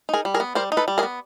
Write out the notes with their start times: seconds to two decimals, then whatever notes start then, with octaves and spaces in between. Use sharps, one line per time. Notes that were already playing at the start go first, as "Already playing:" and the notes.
0.09 D#4 G#4 A#4
0.25 G3
0.34 G#4 A#4
0.40 B3
0.55 G3 A#4 C5
0.72 D#4
0.77 A4 B4
0.88 G3
0.98 G#4 A#4
1.03 B3